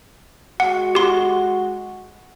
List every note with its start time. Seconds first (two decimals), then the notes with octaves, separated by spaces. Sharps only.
0.60 G#3 F#4 F#5
0.95 G4 C6